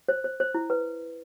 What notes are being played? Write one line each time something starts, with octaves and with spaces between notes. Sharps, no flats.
C5
C5
C5
E4
B4